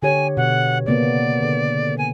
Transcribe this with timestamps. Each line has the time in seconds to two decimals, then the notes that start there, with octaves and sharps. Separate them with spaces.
0.03 D3 G4 C#5 G#5
0.37 B2 F#5
0.86 C#3 A#3 B3 D5
1.42 D3
1.98 G#5